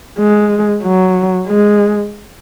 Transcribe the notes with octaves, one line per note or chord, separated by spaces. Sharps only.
G#3
F#3
G#3